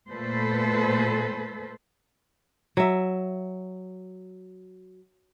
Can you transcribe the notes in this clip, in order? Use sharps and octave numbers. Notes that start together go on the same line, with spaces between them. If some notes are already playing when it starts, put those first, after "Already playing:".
A#2 A3 A4 B4 C5
F#3 E5